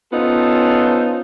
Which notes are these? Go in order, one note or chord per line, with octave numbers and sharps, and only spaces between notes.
B3 C#4 D#4 F4 A4 C5